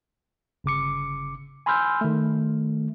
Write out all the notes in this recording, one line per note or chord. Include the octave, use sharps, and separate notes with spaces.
G1 C#3 D6 C#7
G#5 B5 C6 E6 F6 G6
D#3 A3